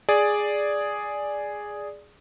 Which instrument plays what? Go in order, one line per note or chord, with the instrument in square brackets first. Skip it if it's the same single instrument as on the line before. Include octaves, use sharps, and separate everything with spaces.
[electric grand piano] G#4 D5